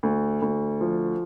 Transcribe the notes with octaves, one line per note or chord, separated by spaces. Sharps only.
D2
D2
F3